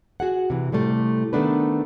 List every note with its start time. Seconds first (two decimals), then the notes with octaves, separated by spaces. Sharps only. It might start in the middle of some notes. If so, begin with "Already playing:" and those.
0.20 F#4 G#4 F#5
0.50 C3 E3
0.72 A2 C3 G3 A3
1.33 D#3 A3 B3 D4 B4